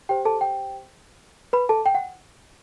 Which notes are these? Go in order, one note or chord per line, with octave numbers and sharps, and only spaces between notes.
G4 C5 G5
A4 A5
G5
B4 B5
A4 A5
G5
F#5